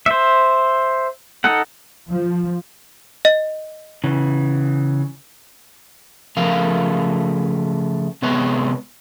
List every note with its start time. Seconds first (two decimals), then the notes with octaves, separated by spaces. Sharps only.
0.06 C5 E5
1.44 D#4 A4 F#5
2.10 F3
3.25 D#5
4.04 C#3 E3
6.37 C#3 F3 A3 A#4 F5
8.22 C3 G#3 B3 B4 C#5